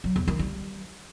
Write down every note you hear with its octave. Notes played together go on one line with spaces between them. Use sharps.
F#3
E2
D#3
G3